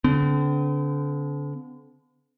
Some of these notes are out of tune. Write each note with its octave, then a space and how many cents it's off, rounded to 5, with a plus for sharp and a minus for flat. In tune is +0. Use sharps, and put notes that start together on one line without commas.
D3 -35 C4 -45